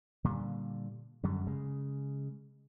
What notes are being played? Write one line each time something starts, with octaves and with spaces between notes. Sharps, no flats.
A#2 D3 G3
F#2 D3 G3
C#3 G#3